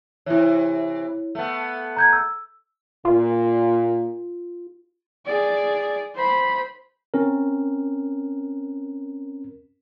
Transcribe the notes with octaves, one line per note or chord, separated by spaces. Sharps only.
C3 E3 E4 C#5
A3 B3
A#5 G6 G#6
E6
A#2 F4
G#4 D5
C5 B5
C4 C#4 A#4